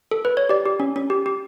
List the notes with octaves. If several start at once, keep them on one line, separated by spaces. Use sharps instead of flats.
A4
B4
C#5
G4 D5
G4
C#4
C#4
G4
G4